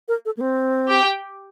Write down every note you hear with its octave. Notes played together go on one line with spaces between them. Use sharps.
A#4
A4
A#3
C4
G4 G5